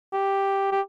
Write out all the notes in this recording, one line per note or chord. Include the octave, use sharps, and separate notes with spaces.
G4
G4